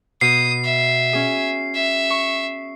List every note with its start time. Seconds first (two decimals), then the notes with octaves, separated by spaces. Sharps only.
0.21 B2 D#6 C7
0.64 E5
1.13 C#4 G#4
1.74 E5
2.10 C#6